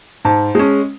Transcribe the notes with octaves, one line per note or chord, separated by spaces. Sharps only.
G#2 A5
G#3 C#4